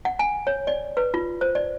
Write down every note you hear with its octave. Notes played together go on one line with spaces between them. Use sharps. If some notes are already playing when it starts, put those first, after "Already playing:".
F#5
G#5
C#5
D5
B4
F4
C5
D5